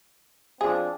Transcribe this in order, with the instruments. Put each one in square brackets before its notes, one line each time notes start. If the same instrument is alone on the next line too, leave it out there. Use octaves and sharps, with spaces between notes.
[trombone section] F3 C4 D4 [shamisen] G#4